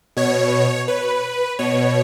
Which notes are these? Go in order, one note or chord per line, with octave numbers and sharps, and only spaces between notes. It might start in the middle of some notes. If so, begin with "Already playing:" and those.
B2 C#5
B4
B2 C#5